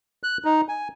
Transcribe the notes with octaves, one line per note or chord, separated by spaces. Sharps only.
F#6
D#4
G#5